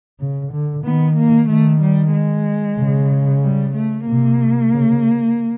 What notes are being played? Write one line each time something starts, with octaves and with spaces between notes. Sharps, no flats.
C#3
D3
D#3 B3
A#3
D#3 A3
G3
G#3
C#3
G3
A3
C3 A#3
C#3